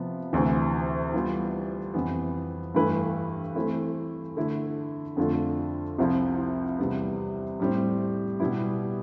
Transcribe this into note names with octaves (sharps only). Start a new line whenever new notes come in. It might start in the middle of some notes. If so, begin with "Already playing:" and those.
Already playing: C3 F3 B3
D2 C3 E3
E3 G3 B3 F4 B4
F2 E3 B3
G2 E3 A3 E4 B4
E3 A3 C4 E4
D3 A3 E4 A4
F2 D3 A3 D4 F4
C2 C3 F3 C4 E4
E2 C3 G3 B3
A2 G3 C4
B2 G3 B3 E4